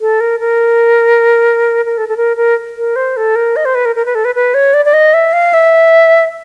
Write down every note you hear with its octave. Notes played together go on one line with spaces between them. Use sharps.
A4
A#4
A#4
A#4
A4
A4
A#4
A#4
A#4
C5
A4
A#4
D#5
C5
B4
A#4
A#4
B4
A4
B4
B4
C#5
D5
D5
D#5
E5
F5
E5